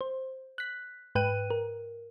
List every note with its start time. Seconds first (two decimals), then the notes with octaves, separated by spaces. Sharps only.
0.01 C5
0.58 F#6 B6
1.15 G#2 B4 G5 F#6 D#7
1.50 A#4